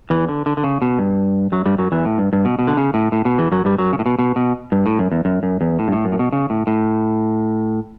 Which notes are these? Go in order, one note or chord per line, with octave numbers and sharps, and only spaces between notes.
E2 E3
D3
D3
D3
C#3
B2
G2
F#2 F#3
G2 G3
F#2 F#3
E2 E3
A2
G2
G2
B2
B2
D3
C#3
A2
A2
B2
E2 E3
F#2 F#3
G2 G3
F#2 F#3
C#3
A2
B2
B2
B2
G2
A2
F#2
E2
F#2
F#2
E2
A2
G2
A2
F#2
A2
B2
C#3
A2
A2